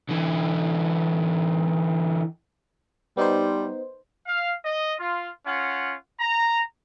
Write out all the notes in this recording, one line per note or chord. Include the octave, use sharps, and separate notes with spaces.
D3 E3
G3 B3 D#4 C5
F5
D#5
F4
C#4 F4 F#5
A#5